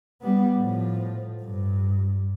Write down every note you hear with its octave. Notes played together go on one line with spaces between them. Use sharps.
G3 B3
A2 F3
G2